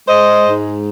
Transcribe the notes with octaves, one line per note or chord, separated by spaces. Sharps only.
G#3 C5 D#5
G#2